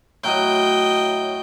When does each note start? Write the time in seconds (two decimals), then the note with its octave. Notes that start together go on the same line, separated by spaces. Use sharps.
0.23 A2 F#3 D#5 G5